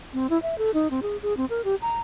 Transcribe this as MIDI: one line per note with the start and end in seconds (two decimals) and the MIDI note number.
0.14 0.29 60
0.30 0.41 64
0.42 0.58 76
0.58 0.71 69
0.74 0.90 63
0.91 1.00 60
1.03 1.17 68
1.23 1.36 68
1.37 1.45 60
1.50 1.62 70
1.65 1.75 67
1.82 2.01 82